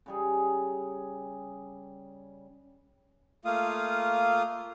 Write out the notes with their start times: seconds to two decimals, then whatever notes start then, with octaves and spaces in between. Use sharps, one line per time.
0.06 C#3 G3 G#4
3.45 A3 A#3 F4 F5 D#6